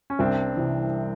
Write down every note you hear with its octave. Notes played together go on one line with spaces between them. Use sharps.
C#4
C2 C4 D4
C3 E3